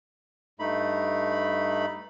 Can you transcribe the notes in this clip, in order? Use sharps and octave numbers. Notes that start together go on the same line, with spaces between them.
G2 A3 D#4 B5